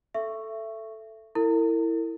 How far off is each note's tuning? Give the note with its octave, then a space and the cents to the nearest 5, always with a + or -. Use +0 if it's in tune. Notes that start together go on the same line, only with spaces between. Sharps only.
A4 +0 E5 +20 C#6 +0
E4 +0 A#4 -45